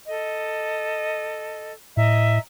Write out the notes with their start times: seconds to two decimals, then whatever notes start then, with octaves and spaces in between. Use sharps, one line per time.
0.07 A4 D#5
1.97 A2 D#5 E5 A#5